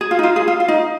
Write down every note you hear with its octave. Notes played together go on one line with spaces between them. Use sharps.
G#4
F4
D#4
F4
G#4
F4
F4
D#4